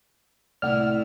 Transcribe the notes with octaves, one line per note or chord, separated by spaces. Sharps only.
C2 A2 A3 E4 D5 F#5 F6